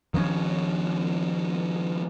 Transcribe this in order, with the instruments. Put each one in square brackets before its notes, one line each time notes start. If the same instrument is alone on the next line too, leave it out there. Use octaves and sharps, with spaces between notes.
[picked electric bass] D#3 F3 B3 C#4